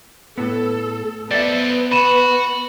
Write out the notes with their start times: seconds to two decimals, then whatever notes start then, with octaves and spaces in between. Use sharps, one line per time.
0.38 A2 B3 A4
1.31 B3 C4 A4 D5 E5
1.92 F#4 B5 D#7 E7